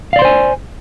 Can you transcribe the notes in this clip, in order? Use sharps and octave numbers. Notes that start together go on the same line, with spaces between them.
C5 D5 F5 G#5 C6